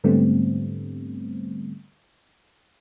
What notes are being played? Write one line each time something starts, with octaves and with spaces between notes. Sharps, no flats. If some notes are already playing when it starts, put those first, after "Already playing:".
G#2 D3 G3 A3 B3 C4